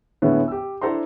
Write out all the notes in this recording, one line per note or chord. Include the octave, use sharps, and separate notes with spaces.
A2 D3 G#3 B3 C#4
G4 E6
D4 E4 A4 C5 A#5 C6